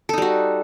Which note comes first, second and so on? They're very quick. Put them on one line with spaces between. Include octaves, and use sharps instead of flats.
A4 D#4 G3 F#4